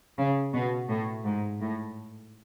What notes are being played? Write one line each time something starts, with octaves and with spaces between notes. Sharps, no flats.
C#3
B2
A2
G#2
A2